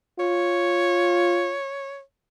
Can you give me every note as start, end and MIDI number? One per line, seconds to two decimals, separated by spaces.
0.19 1.56 65
0.19 2.01 73